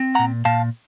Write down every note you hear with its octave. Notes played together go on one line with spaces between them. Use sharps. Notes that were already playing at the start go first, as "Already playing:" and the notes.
Already playing: C4
A#2 F#5 A#5
A#2 F5 A5